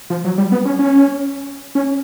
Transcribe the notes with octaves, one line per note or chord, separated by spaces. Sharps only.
F3
F#3
G3
B3
C#4
C#4
C#4